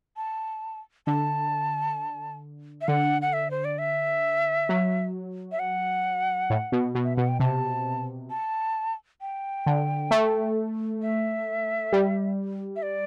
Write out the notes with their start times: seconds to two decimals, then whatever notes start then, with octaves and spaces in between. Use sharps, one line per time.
0.17 A5
1.07 D3 A5
2.81 E5
2.88 D3 F#5
3.22 F#5
3.33 E5
3.51 C5
3.65 D5
3.78 E5
4.69 F#3
5.52 E5
5.59 F#5
6.50 A2
6.72 B2
6.95 B2
7.04 E5
7.16 B2 F#5
7.28 G5
7.40 C3 A5
8.30 A5
9.21 G5
9.66 D3
10.11 A3
11.02 E5
11.92 G3
12.76 E5
12.83 D5